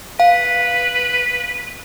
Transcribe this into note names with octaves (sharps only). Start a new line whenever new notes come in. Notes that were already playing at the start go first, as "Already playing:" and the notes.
B4 F5